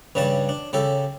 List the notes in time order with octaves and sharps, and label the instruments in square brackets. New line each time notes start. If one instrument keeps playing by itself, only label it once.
[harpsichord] G2 C#3 G3 D4 A5
D4
C#3 G4 A4